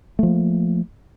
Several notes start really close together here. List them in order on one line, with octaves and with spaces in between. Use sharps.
A3 F3 A#3